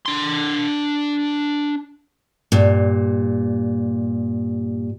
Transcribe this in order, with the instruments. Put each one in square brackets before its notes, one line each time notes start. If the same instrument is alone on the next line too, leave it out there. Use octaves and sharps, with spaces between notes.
[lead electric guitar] D4 C6
[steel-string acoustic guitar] G2 A#2